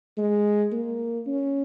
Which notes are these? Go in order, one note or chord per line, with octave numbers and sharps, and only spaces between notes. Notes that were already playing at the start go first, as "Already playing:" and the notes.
G#3
A#3
C#4